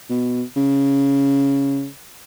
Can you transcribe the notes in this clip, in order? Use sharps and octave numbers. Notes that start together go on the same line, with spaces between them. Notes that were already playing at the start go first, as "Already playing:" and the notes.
B2
C#3